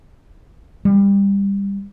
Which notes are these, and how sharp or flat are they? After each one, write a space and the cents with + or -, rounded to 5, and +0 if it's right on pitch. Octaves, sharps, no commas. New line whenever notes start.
G3 +20